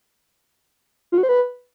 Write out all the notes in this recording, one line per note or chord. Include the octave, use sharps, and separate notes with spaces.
F4
F#4
C5
B4